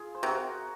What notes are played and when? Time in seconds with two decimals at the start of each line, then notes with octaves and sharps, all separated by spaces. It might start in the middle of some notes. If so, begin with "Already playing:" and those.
Already playing: F4 G#4
0.15 C5
0.23 C3 F#4 A#4